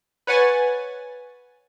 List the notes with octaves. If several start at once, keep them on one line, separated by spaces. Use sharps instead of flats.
B4 C#5 F#5 G#5 A6